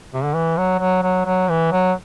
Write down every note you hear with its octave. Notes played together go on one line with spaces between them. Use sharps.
C3
D3
E3
F#3
F#3
F#3
F#3
E3
F#3